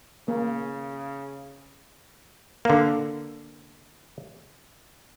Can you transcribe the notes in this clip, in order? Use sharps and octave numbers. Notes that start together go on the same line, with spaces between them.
C#3 A#3
D3 A#3